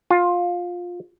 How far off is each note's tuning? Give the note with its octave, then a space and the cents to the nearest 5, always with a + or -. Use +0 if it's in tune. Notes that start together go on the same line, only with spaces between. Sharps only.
F4 +15